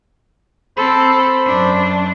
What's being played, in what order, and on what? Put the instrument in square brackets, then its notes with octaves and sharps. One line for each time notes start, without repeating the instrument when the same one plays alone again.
[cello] C4 A4 [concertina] C5 B5
[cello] F#2 D4